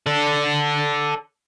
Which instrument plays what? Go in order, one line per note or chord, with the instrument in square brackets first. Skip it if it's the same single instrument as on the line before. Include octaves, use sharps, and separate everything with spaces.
[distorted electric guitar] A4 D5